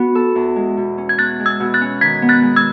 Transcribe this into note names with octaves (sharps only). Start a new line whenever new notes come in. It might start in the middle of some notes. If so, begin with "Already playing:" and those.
Already playing: B3 F#4
A4
E2
G#3
B2
C#4
G#6
E2 F#6 A6
G#3
E6 G#6
B2
F#6 A6
C#4
D#3 G#6 B6
B3
F#6 A6
G#3
E6 G#6